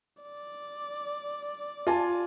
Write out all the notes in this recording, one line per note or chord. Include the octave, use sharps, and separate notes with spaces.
D5
F4 G#5 A5